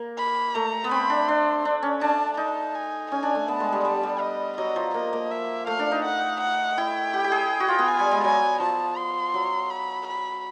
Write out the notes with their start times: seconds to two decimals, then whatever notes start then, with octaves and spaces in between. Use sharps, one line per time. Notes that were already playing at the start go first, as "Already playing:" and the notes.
Already playing: A#3
0.18 B5
0.54 A3 A#5
0.84 B3
0.91 C4 B5
1.10 D4
1.28 D4 C6
1.65 D4
1.83 C#4
2.01 D4 A5
2.37 D#4 A5
2.75 G#5
3.11 C#4 G#5
3.23 D4
3.35 A3
3.48 B3 A5
3.60 G#3
3.73 G3
3.84 G3 A5
4.03 G3
4.21 D#5
4.57 F#3 D#5
4.76 F3
4.94 A#3 D#5
5.13 A#3
5.31 E5
5.67 A3 F5
5.79 D4
5.91 D#4
6.05 F#5
6.40 F#5
6.78 E4 G5
7.14 G4
7.24 G4
7.32 G#4
7.60 F#4
7.68 F4
7.79 B3
7.87 G#5
7.99 G3
8.11 G#3
8.24 F#3 G#5
8.60 F3 A5
8.97 C6
9.34 F#3
9.70 B5
10.07 B5